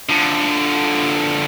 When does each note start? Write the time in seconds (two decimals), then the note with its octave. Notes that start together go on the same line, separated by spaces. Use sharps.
0.09 D3 F3